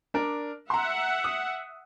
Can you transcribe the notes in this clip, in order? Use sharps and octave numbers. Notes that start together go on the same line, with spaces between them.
D4 A#4 D5
E5 F#5 A#5 C6
D#6